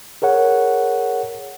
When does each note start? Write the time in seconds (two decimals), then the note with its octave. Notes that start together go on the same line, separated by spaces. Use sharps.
0.22 G#4 A#4 C#5 F#5